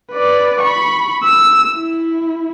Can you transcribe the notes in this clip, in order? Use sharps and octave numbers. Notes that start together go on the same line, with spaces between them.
B4 D5
B5 C#6
E6
E4